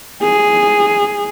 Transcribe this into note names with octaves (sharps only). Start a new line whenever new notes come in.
G#4